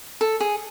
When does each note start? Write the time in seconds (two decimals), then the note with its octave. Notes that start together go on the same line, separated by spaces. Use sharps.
0.21 A4
0.40 G#4